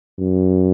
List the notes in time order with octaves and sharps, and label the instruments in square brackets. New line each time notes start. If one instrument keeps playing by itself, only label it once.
[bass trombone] F#2